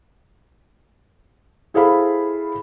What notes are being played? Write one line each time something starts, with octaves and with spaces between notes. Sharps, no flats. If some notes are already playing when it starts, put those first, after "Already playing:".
E4 G#4 A4 C5 F5 B5